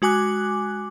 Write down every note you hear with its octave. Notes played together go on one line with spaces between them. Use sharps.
G#3 F#4 G#5 D6 F#6